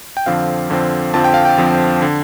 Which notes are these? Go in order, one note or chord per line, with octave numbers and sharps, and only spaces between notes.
G5
F2 D3 F3 C4 F5
F2 D3 F3 C4
F2 D3 F3 C4 A5
G5
F5
G5
F2 D3 F3 C4
D3